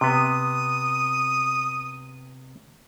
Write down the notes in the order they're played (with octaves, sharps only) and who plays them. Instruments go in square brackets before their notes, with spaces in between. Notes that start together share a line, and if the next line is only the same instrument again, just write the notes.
[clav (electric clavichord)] C3 B3 [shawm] D#6